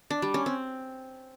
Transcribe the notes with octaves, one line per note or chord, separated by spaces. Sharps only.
D4
G3
C#4
C4